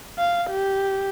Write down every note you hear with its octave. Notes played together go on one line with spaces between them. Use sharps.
F5
G4